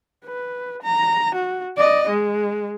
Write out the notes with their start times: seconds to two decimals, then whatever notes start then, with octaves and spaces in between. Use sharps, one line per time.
0.25 B4
0.83 A#5
1.35 F#4
1.77 D5 D#5
2.09 G#3